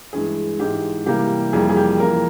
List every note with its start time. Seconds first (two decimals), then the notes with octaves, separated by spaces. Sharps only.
0.13 G2 E3 G#3 G#4
0.59 G#2 E3 G#3 G4
1.06 C3 E3 G3 A#3 G4
1.53 F2 E3 G3 A#3 G#4
1.69 G#4
1.76 G4
2.00 F2 E3 A#3 A#4